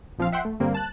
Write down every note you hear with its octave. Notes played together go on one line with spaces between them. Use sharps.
A#1 F3 C4 F5
E5 F#5 G5 C6
A3
G2 D3 G3 A#3 C4
A5 F#6